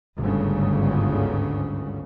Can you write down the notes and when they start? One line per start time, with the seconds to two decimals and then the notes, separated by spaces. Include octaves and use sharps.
0.16 G1 D2 G#2 C#3